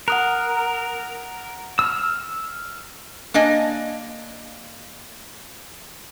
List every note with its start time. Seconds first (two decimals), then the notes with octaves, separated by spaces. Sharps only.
0.08 A#4 F#5 D#6 F#6
1.79 E6 F6
3.34 A#3 D4 D#5 G#5